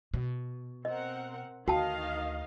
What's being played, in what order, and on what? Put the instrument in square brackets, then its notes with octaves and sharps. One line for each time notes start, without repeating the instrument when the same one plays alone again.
[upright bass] B2
[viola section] C4 A#4 F#5 [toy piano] D#5
[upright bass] D2 [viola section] D#3 D#5 F5 [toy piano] F#4 G5 A5